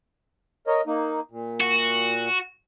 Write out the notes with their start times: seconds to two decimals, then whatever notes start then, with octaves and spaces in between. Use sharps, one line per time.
0.67 A#4 C#5 D#5
0.87 A#3 D#4
1.31 A#2
1.61 F#4